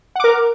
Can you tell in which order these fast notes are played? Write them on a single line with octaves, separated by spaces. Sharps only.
F#5 D6 A#4